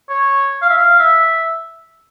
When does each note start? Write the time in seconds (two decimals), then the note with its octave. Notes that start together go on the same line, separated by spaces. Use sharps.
0.09 C#5
0.62 F5
0.70 E5
0.77 F5
1.00 E5